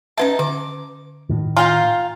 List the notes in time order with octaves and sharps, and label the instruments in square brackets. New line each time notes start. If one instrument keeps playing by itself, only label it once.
[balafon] C#4 B4 E5 [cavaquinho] D#4 F4 A5
[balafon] D3 [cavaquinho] D6
[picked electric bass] A2 D#3
[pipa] F4 [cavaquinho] F5 G5 A#5 [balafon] G#5